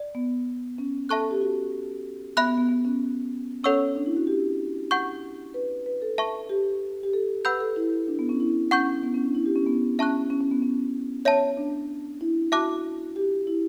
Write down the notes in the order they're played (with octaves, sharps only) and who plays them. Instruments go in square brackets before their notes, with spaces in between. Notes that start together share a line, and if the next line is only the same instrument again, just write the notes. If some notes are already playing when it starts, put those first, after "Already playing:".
Already playing: [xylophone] D5
[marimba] B3
C#4
[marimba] A4 [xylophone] E5 A5 C#6 F#6
[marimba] A4
G4
F#4
[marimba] B3 [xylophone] E5 B5 F#6
[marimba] B3
B3
B3
C#4
[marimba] C#4 [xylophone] A4 C#5 F#5 C#6 E6
[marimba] D4
E4
F#4
G4
[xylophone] F#5 C#6 G6
[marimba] B4
B4
A4
[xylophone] E5 A5 C#6
[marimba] G4
G4
A4
[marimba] B4 [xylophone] F#5 B5 E6 G6
[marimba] A4
E4
D4
B3
C#4
E4
[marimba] C#4 [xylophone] F#5 C#6 G6
[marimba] B3
C#4
D4
E4
G4
C#4
B3
[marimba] C#4 [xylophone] E5 A5 C#6 F#6
[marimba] C#4
C#4
B3
C#4
[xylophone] C#5 E5 A5
[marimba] D4
E4
[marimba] F#4 [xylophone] E5 A5 D6 F#6
[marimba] G4
E4